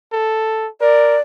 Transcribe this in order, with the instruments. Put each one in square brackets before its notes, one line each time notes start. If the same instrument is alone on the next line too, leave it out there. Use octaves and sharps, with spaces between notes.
[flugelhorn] A4
[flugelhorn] A#4 [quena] D5